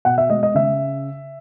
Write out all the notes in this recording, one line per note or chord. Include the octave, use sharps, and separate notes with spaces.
B2 F#5
E5
G#3 D#5
D#5
C#3 E5